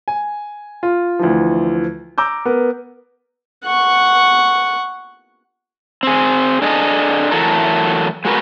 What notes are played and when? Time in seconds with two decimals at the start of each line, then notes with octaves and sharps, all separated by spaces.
0.08 G#5
0.83 F4
1.19 D2 E3 F3
2.18 A#5 D6 E6 G6
2.45 B3 A#4
3.65 F#5 C#6
6.03 C4 G#4
6.62 D4 G#4 A4 D#5
7.31 E3 F#3 A3 A4 A#4
8.25 G#3 F#4 A#4 B4